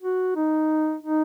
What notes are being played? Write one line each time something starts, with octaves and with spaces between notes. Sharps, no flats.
F#4
D#4
D#4